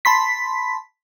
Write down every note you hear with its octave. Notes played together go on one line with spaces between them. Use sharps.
A5 B5 C6 B6